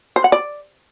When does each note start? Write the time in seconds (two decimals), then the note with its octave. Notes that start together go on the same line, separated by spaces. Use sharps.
0.16 C5
0.24 F#5
0.32 D5